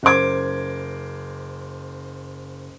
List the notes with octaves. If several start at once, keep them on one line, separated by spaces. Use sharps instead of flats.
F#1 A#4 C5 D6 G#6